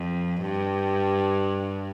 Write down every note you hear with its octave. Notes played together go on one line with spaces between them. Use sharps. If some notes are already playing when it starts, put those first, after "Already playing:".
Already playing: F2
G2